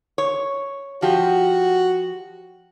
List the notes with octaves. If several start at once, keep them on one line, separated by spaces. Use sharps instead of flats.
C#5
F3 F#4 G4